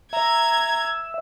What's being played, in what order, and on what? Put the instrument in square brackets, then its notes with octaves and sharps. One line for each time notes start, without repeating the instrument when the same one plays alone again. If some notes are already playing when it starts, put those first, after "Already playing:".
[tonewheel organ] E5 [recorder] A#5 [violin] G#6